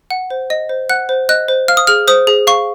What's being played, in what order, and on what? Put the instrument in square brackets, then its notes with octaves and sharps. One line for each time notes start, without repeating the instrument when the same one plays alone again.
[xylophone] F#5
C5
D#5
C5
F#5 F#6
C5
D#5 F#6
C5
F5 F6
D#6
G#4 F6
C5 D#6
G#4
F5 C#6